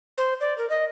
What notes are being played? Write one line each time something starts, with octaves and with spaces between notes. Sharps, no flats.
C5
D5
A#4
D#5